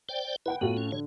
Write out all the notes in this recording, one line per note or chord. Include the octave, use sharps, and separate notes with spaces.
C5 D5 G5
E4 B4 F#5 G5
A2 B3 F4 F#4
C#4
D3 C#5